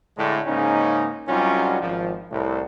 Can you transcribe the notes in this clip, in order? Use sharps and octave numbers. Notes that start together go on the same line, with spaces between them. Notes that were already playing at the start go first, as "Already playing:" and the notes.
A2 D3 G#3
G#2 C#3 A#3 C#4 D#4
C2 F#3 G3 C#4 D#4 F4
G#1 F3
C2 A2